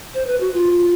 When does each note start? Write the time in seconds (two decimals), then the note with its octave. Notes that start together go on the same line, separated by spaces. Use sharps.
0.14 C5
0.27 B4
0.40 F#4
0.54 F4